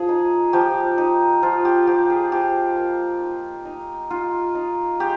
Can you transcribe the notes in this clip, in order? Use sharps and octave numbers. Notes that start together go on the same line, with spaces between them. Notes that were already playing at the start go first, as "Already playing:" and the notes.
Already playing: F3 G#4
D#4
F3 G4
D#4
F3 F4
G4
F3 G4
G#4
F3 G4
A#3
D#4
D#4
D#4 F4
D#4
G#3 G4